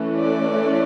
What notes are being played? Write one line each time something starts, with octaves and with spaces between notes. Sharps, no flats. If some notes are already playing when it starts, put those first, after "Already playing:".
Already playing: E3 A3 C#4
D5